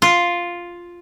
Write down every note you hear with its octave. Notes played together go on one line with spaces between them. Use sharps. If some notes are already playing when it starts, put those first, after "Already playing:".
F4